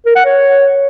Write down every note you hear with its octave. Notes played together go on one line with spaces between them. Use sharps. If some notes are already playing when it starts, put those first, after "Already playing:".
A#4
F#5
C#5